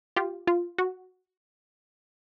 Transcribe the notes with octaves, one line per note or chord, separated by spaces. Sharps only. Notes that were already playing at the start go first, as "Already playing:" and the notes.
F4 G4
F4
F#4